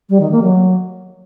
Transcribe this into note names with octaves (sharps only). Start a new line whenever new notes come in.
G3
D#3
A#3
F#3